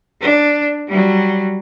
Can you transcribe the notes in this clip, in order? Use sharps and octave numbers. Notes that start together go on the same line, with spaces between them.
D4
F#3 G3